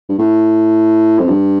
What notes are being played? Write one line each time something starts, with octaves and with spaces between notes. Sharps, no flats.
G2
A2
F2
G2